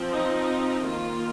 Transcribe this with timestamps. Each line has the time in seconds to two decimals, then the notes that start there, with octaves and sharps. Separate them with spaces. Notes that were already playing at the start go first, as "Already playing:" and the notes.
Already playing: F3 C4
0.13 D#4
0.83 D#3 A#3 F4